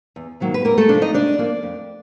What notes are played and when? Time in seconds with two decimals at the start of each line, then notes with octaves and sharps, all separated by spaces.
0.16 E2
0.40 C3 D#3 F#3 A#3
0.54 B4
0.65 E2 A#3 A#4
0.78 A3 A4
0.89 C3 F3 D4 D5
1.02 D#4 D#5
1.14 C#3 D4 D5
1.38 F3 A#3 D4
1.63 F2